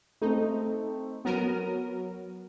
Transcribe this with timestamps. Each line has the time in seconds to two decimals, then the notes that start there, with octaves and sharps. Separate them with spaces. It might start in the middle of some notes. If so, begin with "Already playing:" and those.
0.21 A3 C4 D#4
1.25 F#3 B3 A#4 D#7